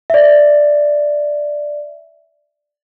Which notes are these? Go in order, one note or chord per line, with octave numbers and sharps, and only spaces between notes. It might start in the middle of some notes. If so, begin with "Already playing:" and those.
D5 E5